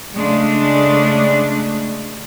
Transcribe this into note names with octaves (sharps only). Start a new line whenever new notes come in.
C#3 G#3 A3 D4